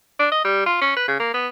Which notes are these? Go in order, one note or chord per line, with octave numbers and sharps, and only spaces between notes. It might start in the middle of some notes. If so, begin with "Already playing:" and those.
D4
D#5
G3
F4
C#4
B4
C#3
A#3
B3